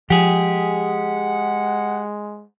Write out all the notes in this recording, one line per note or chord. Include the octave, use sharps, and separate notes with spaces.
F3 G#3 G4 G#4 F#5